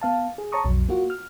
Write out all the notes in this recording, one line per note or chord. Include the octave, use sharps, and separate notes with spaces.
B3 F5 A5
G#4
C#5 A5 A#5 C#6 D#6
B1 F2 F#3
A#3 F4 F#4
F6